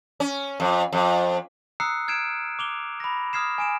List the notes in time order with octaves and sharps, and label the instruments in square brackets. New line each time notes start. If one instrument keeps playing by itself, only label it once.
[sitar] C#4
F2
F2
[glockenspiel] A#5 D#6 E6 F#6 C7 C#7
F6 G#6 C7 D7 E7
D6 F7 G7
B5 A#6
D#6 F6 G#6 C7 E7
G#5 D7 E7